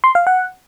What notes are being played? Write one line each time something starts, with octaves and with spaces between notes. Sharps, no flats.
C6
F5
F#5